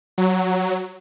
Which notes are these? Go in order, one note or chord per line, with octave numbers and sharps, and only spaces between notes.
F#3